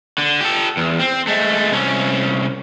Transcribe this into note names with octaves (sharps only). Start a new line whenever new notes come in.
D3
G4 A4
E2
C4
G#3 A3
C2 C#4